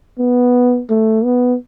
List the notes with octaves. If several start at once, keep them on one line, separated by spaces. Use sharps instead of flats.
B3
A3
B3